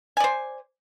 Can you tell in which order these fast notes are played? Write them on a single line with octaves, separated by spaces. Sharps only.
G#5 D5 C5